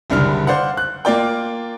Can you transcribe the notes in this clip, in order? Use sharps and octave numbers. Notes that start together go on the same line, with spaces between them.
F#1 C2 D3 G3 F6
C5 D5 F5 F#5
F#6
A#3 F4 D5 G5